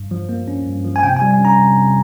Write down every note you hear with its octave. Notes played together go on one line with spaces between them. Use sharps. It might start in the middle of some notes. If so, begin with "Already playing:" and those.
Already playing: G2
F3
A#3
C#4
G2
F3
G#5
C3 G5
G#5
G3
G#5
C#4 A#5
C3
C3